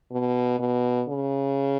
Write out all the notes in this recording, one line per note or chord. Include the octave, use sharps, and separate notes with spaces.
B2
B2
C#3